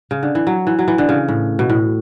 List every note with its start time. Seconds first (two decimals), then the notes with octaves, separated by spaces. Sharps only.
0.11 C#3
0.23 D3
0.35 E3
0.47 F#3
0.67 E3
0.79 F#3
0.88 E3
0.98 D3
1.09 C#3
1.28 A2
1.59 B2
1.70 A2